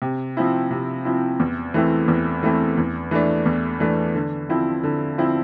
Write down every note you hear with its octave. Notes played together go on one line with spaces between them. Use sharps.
C3
F3 C4 E4
C3
F3 C4 E4
E2
E3 A3 C4 E4
E2
E3 A3 C4 E4
E2
E3 A3 D4
E2
E3 A3 D4
D3
F3 C4 E4
D3
F3 C4 E4